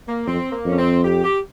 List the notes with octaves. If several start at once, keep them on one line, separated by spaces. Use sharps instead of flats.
A#3
F2 C4
A#3
F2 C#4
C4
G4
G4